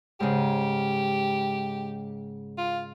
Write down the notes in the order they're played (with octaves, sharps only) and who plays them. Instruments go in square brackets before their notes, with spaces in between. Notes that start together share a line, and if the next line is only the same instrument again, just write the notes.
[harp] G#2 C#3 [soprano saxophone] G4
[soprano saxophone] F4